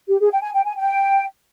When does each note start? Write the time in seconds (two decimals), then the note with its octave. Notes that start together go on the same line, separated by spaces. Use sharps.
0.08 G4
0.20 G#4
0.31 G5
0.42 G#5
0.54 G5
0.65 G#5
0.76 G5